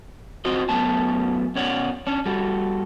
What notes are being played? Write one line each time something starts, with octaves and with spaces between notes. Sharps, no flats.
C4 F4 F#4 C5 D#5
F#2 A3 B3 C#4 A5
B2 C#4 C#5 D5 F#5
C#4 D4
G3 F#4 A4